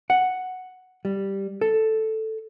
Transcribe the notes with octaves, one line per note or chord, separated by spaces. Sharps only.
F#5
G3
A4